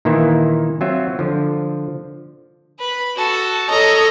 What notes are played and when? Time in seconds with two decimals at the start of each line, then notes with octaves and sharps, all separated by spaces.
0.05 A#2 D#3 E3 A#3 E4 E5
0.81 F#3 C4 F4 E5
1.19 D3 F3
2.79 B4 B5
3.16 F#4 A4
3.70 A4 C#5 D#5 A#5